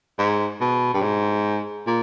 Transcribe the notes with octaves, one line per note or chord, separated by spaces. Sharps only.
G#2
B2
G2
G#2
A#2